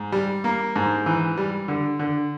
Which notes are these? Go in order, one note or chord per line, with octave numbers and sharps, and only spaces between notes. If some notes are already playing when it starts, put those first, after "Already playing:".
Already playing: G#2
G3
A#3
G#2
E3
G3
D3
D3